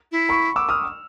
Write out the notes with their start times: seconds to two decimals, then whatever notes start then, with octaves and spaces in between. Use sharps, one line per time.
0.12 E4
0.29 B5 C#6
0.56 D6 E6
0.69 D#6 F6